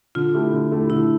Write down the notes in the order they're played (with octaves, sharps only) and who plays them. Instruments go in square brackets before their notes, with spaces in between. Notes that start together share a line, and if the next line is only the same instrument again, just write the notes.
[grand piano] D3 [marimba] F4
[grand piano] A3 E4 G4
D3
A3 E4 G4
[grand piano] D3 [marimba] E4